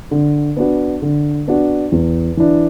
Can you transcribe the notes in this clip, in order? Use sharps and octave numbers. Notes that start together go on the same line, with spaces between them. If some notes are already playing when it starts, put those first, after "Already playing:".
D3
B3 D4 F#4
D3
B3 D4 F#4
E2
E3 D4